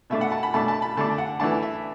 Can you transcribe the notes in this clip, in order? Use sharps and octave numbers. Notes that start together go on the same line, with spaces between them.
B2 A3 D4 E5
F#5
A5
B5
B2 A3 D4 A5
A5
B5
D3 A3 D4 A5
F#5
E3 A3 D4 A5
E5